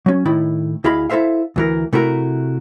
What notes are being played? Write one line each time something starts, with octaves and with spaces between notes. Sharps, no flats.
F#3 C#4
A2 D#3 E4
D2 E4 G#4 D#5 F5 B5
E4 A4 C5 E5 F5
D2 E3 A#4
C3 A3 E4 F#4 A#4